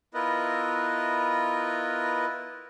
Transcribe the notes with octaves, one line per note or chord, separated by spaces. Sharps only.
B3 E4 F4 A#4 B4 D#5